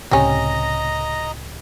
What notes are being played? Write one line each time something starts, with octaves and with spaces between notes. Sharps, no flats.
C#2 A2 C3 G3 C#4 D#5 A#5